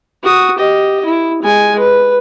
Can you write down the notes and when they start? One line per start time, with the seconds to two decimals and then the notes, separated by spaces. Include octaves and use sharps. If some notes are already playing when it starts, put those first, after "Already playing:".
0.23 F#4 D#6
0.58 G4 D#5
1.05 E4
1.42 G#3 G#5
1.79 B4